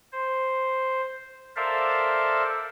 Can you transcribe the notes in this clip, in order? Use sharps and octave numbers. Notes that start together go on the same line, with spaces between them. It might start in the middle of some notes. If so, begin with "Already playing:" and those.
C5
A4 A#4 C5 D5 E5 F5